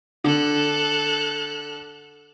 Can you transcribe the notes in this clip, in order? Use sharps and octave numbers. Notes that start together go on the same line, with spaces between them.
D3 A4 F#6